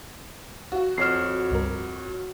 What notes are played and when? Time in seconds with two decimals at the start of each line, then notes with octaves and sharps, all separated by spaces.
0.72 F#4
0.98 F2 C#5 F6 C7 E7
1.51 C#2 G2 A#4